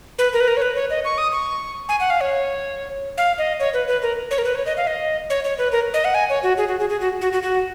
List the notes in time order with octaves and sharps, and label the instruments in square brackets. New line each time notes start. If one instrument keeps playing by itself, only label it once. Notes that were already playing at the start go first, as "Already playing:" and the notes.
[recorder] B4
A#4
B4
A#4
C#5
B4
C#5
D#5
C#6
D#6
C#6
G#5
F#5
F5
C#5
F5
D#5
C#5
B4
B4
A#4
C#5
A#4
B4
C#5
D#5
F5
D#5
C#5
C#5
B4
A#4
D#5
F#5
G#5
C#5
F#4
G#4
F#4
G#4
G#4
F#4
F#4
F#4
F#4